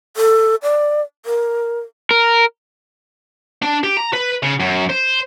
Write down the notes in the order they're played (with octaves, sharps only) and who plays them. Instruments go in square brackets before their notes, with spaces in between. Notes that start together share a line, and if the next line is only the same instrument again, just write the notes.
[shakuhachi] A4
D5
A#4
[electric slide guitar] A#4
[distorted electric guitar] D4
G4
A#5
B4
C#3
F#2
C5